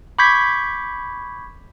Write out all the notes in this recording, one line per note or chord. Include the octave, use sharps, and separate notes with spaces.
B5 C#6 D6 G6 G#6 B6